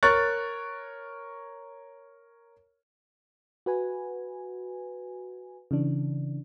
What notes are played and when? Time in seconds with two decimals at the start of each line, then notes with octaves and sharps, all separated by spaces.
0.03 A#4 C#5 C#6 F#6 A6
3.66 F#4 B4 G#5
5.71 C#3 E3 D4